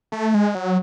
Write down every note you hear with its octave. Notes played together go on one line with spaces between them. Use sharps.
A3
G#3
F#3